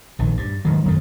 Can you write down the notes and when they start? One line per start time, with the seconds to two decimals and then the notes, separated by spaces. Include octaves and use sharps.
0.19 A#1 D#3
0.37 G2
0.65 G#2 D#3 F#3
0.84 F#2 D#3 A3